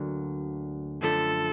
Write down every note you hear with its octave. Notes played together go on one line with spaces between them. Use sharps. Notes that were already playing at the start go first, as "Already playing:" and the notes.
Already playing: D2 D3 F#3 A#3
F#2 D3 F3 A3 A4